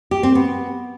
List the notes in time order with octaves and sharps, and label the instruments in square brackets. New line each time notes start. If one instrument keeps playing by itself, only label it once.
[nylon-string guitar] G4
C4
B3